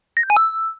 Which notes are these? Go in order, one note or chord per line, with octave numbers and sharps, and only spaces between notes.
A#6
G6
G#5
E6